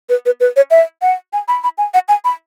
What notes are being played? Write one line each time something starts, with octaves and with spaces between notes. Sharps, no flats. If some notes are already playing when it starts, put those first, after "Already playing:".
B4
B4
B4
C#5
E5
F#5
G#5
B5
B5
G#5
F#5
G#5
B5